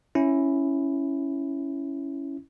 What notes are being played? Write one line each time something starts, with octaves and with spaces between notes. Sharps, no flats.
C#4 E4